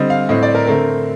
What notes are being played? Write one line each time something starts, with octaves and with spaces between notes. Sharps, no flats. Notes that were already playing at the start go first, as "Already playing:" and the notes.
Already playing: D3 G3 C4 D#5
F5
A2 A3 C4 D#5
D5
A#4
D3 A3 C4 A#4